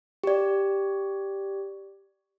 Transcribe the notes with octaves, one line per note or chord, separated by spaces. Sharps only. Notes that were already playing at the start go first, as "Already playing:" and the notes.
G4 D5